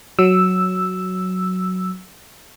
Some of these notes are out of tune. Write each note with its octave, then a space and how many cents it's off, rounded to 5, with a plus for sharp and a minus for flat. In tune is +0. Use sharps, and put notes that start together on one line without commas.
F#3 +0 E6 +0